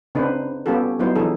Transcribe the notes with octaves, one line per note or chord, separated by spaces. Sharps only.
C#3 C4 D4 D#4 B4 C5
G3 B3 C#4 F4 G4 A4
F#3 G3 B3 D#4 E4 C5
E3 F3 D4 E4 G#4 A4